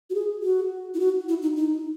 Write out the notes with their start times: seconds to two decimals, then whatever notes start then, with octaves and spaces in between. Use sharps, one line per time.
0.10 F#4
0.15 G#4
0.43 F#4
0.94 E4
1.00 F#4
1.29 E4
1.42 D#4
1.56 D#4